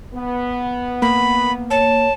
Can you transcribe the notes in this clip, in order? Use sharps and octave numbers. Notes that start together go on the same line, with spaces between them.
B3
A#3 B5
C#5 A5